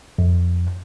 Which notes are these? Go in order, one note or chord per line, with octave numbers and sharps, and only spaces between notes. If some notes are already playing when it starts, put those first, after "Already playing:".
F2